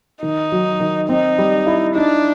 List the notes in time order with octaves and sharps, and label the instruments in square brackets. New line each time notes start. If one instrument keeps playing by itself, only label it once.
[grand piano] D#3 [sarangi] D#4
[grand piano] F#3
D#3
[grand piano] C4 [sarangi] D#4
[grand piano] G3
E4
[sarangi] D4 [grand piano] D#4